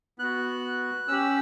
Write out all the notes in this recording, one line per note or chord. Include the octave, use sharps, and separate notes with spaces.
B3 F#4 F#6
C#4 G4 E6